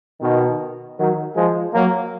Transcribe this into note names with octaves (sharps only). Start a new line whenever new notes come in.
B2 D#3
D#3 F#3
F3 G#3
F#3 A#3